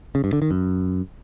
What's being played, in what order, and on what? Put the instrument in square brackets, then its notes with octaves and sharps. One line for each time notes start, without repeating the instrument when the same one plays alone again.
[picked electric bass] C#3
G2
D3
D#3
F#2